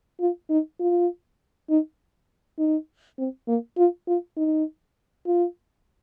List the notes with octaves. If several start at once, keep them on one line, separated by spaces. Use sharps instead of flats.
F4
D#4
F4
D#4
D#4
C4
A#3
F4
F4
D#4
F4